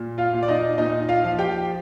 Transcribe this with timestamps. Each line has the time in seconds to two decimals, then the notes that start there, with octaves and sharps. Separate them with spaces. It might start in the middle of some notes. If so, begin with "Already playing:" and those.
Already playing: A#2
0.18 F4 F5
0.33 A#2
0.43 D5
0.48 D#4 D#5
0.78 A#2 D#4 D#5
1.09 F4 F5
1.23 F3
1.39 G4 G5